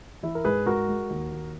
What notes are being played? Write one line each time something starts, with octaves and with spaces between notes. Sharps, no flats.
E3 E4
A#4
G#2 G#4 B4
G#2 F#4 A#4
G#3
D#2
D#2